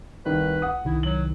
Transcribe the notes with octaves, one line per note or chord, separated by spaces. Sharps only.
C2 D#3 B4
F#5 D#6
C2 D#3 E4
F#3 F#7